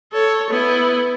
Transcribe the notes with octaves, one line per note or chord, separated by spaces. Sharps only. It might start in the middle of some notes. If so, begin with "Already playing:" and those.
A4 C#5
B3 E4